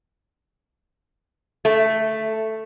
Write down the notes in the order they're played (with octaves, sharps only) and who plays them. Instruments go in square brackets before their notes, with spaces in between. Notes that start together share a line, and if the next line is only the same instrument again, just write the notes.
[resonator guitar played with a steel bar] A3